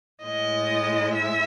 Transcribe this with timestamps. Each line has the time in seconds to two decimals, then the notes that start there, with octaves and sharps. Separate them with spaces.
0.22 A2 G#3 D#5
1.12 E5